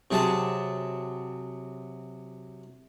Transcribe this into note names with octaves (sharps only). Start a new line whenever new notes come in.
C3 F#3 G#4 A5